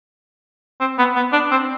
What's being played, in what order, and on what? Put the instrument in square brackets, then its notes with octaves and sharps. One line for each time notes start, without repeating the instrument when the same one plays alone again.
[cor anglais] C4
B3
B3
D4
C4